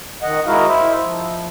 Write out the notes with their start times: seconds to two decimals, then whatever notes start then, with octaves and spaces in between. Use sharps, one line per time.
0.22 D#3 D#5 F#5
0.46 G#3 E4 F#4 A#4 D#5 F5
0.67 E4 C5 E5
1.03 F3